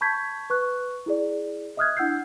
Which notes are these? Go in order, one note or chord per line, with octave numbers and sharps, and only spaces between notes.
A5 B5 C#6 G6 G#6 B6
B4 C#6 F#6
E4 G#4 D5
D#5 E5 D#6 F6 F#6 G#6
D4 E4 F#5 E6 G6 C7